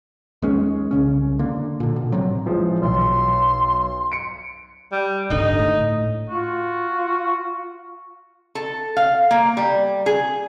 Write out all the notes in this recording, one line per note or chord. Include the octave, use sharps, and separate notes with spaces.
D#2 G#3 C#4
C2 C#3 C#4
D3 A#3
A#2 D3
B2
A1 A2 C3 F#3
A1 F3 G#3
B1 C6
C#7 D7
G3
D1 G1 D3 D#4
A2
F4 F#4
A4
F5
A#3
G3
G#4